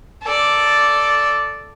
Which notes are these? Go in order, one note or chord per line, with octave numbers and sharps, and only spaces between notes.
A4 D5